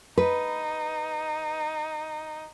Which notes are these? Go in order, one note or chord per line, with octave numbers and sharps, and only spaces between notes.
D#4 B4